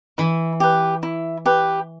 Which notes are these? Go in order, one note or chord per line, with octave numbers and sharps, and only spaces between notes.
E3 E4
G4 B4
E4
G4 B4